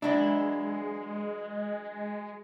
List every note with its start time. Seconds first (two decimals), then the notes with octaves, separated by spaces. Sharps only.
0.02 E3 F#3 G#3 D4 E4